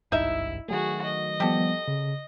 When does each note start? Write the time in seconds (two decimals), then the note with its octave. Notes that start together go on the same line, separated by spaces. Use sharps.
0.12 G#1 C#2 G2 D#4 E4 E5
0.68 D#3 F#3 A3 F#4 G#4
1.05 D#5
1.40 F3 G3 B3 G4 A4
1.88 C#3